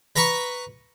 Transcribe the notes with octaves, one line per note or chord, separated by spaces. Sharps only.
B4 A#5 B5 C#6